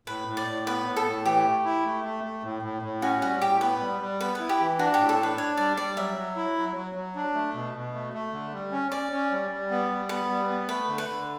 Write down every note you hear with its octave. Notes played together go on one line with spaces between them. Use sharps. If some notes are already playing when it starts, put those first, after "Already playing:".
A2 B4
A2
D5
A2
B3 B4
A2
A4
A2
E3 G4
A3
E4
A3
A3
A3
A2
A2
A2
C#4 F#4
G3 F#4
A2 G4
B3 B4
G3
G3
B3 B4
E4 B4
G4
E3
D4 F#4
A2 G4
A4
D4 B4
D4 C#5
G3 D5
G3 D5
F#3 E5
F#3
E4
F#3
F#3
F#3
D4
A3
B2
B2
A3
A3
D3
G3
C#4
C#4 D5
C#4
G3
G3
B3
G3
B3 B4
G3
B3
A3 B4
D3
B4
D3